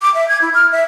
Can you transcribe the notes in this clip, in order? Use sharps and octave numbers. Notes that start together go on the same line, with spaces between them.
D6
E5
G#6
E4
F6
E5